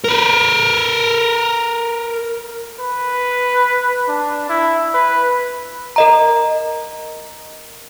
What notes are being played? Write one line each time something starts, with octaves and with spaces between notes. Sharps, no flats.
A#4 B4
B4
D4
E4
B4
A#4 D#5 A#5